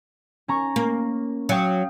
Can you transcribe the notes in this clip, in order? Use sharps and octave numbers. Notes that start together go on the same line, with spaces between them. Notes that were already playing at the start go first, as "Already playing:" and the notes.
C#4 A#5 C#6
A#3
F#3 F5 G5 D#6